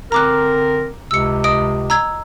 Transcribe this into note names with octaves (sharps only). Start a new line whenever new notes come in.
D3 C4 A#4 A#5 D6 F#6
C#2 C3 E6 C#7
D#5 D#6 D7
A#5 E6 G#6